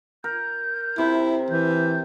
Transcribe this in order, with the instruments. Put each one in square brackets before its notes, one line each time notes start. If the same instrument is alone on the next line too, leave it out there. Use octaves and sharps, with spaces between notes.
[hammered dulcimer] A#4 [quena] G6
[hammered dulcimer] C3 [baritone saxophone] E4
[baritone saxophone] E3 [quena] G6